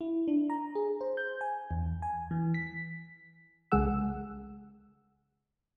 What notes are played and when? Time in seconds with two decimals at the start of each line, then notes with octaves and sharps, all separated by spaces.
0.01 E4
0.28 D4
0.50 A#5
0.75 G#4
1.01 C5
1.17 G6
1.41 G#5
1.71 E2
2.02 G#5
2.31 E3
2.54 B6
3.72 C2 C#3 G#3 G#4 F#5 E6